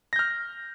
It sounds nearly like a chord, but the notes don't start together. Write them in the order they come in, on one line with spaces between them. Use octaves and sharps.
A#6 G6 F6